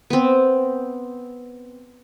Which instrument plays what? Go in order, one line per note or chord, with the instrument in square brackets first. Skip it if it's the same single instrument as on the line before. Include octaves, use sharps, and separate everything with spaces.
[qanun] B3 C4